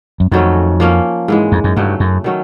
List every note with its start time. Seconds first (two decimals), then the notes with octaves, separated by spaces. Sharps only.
0.20 F#2
0.31 F2 D#3 F#3 A3 C#4
0.80 F3 A#3 C#4
1.28 G#2 E3 G#3
1.52 F2
1.64 F#2
1.76 G2 C#3 F#3 A3
2.00 F#2
2.24 D#3 F#3 A3 C#4